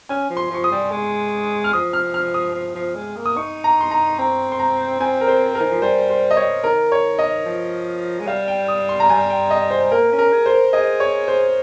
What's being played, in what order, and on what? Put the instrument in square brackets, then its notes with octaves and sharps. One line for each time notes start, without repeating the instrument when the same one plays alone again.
[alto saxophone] C#4 [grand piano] G#5
[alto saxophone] F3
[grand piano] C6
[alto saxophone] F3 [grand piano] C#6
[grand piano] D#6
[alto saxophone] G3
G#3
[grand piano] F6
[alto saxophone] F3 [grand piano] D#6
[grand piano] F6
F6
D#6
[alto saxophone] F3
F3
G#3
A#3
[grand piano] D#6
[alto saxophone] D#4 [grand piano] C#6
[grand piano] A#5
C6
A#5
[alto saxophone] C4 [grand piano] A#5
[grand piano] C6
A#5
[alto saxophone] C4 [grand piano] G#5
[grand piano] A#4
C5
A#4
[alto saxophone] D#3
F3
[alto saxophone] G3 [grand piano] C5
[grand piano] C5
D#5
C#5
[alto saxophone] D#3 [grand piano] A#4
[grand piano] C#5
D#5
[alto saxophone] F3
G#3
[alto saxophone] G3 [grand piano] F5
[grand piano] G5
D#6
C6
A#5
[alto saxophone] G3 [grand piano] G#5
[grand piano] G5
D#5
C5
[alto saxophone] A#3 [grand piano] A#4
[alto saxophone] C#4
[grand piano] A#4
[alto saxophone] G#4
[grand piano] C5
[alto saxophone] A#4
[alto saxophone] G#4 [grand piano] D#5
[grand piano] C#5
C5